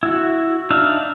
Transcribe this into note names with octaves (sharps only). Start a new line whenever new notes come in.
E4 F#4
D4 D#4 E5 F5